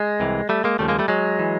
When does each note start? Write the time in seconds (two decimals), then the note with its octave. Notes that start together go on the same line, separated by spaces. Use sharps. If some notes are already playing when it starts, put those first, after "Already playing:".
Already playing: G#3
0.20 C2 C3 E3
0.49 G3 A3
0.64 G#3 A#3
0.79 D#2 C#3 F3 G3 A3
0.88 G#3 A#3
0.99 G3 A3
1.08 F#3 G#3
1.39 E3